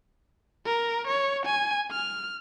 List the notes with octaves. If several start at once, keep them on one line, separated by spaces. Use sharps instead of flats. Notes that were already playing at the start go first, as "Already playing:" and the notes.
A#4
C#5
G#5
F6